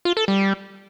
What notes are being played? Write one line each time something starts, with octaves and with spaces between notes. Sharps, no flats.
F4
A4
G3